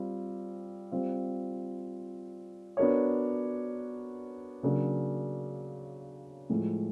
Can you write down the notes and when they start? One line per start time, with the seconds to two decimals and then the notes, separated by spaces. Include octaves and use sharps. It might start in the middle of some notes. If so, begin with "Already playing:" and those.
Already playing: G3 C4 F4
0.91 G3 C4 F4
2.77 B3 D4 F#4 A#4 C#5
4.63 C#3 F#3 A#3 D4
6.49 A2 F3 G#3